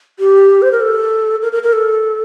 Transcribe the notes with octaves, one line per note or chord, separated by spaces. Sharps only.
G4
C5
A#4
A4
A#4
A#4
A#4
A4